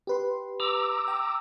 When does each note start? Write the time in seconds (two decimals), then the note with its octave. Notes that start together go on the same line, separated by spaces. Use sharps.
0.07 G4 B4 C6
0.60 A#5 D6 E6
1.08 G5